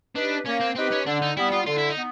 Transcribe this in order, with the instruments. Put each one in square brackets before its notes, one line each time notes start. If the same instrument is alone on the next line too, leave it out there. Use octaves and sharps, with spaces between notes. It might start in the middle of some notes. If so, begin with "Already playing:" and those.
[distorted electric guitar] D4 [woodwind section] D#4 G4 B4
[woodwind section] A#3 [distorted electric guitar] C#4
[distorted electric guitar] C4
[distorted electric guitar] C4 [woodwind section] D#4 G4 B4
[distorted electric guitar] C#4
[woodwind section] D3 [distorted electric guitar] D4
[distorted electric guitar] D#4
[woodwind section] G3 B3 [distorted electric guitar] E4
[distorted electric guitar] F4
[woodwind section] D3 [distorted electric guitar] F4
[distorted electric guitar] E4
D#4
[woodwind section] B3